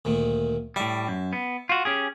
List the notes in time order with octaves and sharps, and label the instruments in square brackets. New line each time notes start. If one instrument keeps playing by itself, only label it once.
[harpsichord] D2 A#2 D#3
[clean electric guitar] A2 G3 [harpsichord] E5 A5
[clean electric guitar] F#2
B3
F4 F#4
C#4 G4 G#4